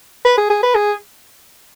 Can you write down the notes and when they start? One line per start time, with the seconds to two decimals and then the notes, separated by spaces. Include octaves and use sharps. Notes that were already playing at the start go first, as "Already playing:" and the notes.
0.25 B4
0.37 G#4
0.50 G#4
0.63 B4
0.75 G#4